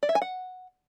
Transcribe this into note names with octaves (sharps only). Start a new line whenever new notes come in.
D5
E5
G#5
F#5